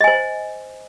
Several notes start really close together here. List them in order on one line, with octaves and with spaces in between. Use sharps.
D#5 G#5 C5